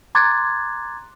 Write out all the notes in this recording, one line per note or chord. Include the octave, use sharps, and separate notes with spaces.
A#5 C6 D6 F#6 G#6 A6